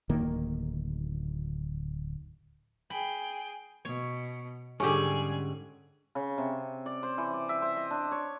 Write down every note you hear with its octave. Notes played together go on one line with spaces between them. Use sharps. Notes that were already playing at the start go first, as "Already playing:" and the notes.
D1 D#3 A#3
G#4 G5 B5
B2 C#5
G#2 D3 G3 C#4 G4 G#4
C#3
C3
D5
C5
E3
D5
E5
C5
D#5
D4
C#5